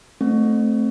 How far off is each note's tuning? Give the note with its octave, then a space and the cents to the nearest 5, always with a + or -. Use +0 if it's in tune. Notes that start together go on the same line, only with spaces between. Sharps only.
A3 +0 C4 +0